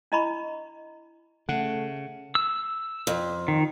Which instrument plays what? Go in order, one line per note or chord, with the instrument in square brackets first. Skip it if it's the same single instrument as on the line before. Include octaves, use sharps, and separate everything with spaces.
[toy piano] D4 E4 D#5 A#5 B5 C#6
[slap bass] C#3 [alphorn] A3 [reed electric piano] F#5
[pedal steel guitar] E6
[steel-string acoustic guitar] F2
[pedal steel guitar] D#3